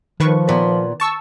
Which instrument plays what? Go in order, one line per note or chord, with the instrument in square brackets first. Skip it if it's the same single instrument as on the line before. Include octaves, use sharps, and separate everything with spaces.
[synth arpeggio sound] D#3 B4 C#6 [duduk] F3
[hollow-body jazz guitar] A#2 B3
[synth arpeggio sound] A5 C#6 E6